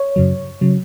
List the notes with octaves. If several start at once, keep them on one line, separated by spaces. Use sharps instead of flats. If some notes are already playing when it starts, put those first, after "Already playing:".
Already playing: C#5
F#2 C#3 F#3
C#3 F#3